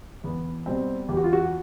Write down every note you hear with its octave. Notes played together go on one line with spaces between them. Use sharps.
E2 B3
B2 G3 C4
E2 G4
F#4
F4
F#4